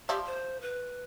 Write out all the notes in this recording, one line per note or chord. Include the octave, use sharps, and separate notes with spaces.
F3 G4 D5 E5
C5
B4